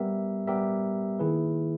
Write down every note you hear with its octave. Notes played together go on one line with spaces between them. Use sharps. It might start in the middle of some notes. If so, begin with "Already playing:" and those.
Already playing: G3 B3 G4 A#4 E5
G3 B3 G4 A#4 E5
D#3 A#3 E4 G#4 B4